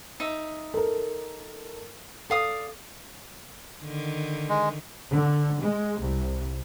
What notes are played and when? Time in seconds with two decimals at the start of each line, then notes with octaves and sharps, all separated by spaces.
0.20 D#4 E5
0.74 A4 A#4
2.30 A4 D5 F5 D#6
3.84 D3 D#3
4.49 G#3
5.13 D3
5.61 G#3
6.02 C2